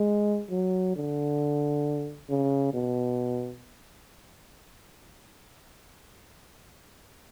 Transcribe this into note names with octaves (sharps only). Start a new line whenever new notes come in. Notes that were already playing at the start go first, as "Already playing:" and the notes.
Already playing: G#3
F#3
D3
C#3
B2